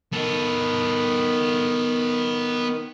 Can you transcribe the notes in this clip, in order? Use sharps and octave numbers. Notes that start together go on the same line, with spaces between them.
D#3 B3 A4